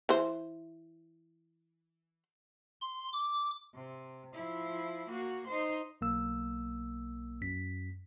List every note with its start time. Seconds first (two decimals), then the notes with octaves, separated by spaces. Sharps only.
0.09 E3 C5
2.81 C6
3.13 D6
3.75 C3
4.34 F3 E4
5.09 A#3 F#4
5.47 D#4 C5
6.01 B1 A#3 E6
7.41 F#2 B6